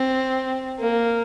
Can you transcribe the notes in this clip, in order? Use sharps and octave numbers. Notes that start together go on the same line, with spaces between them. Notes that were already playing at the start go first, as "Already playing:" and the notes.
Already playing: C4
A#3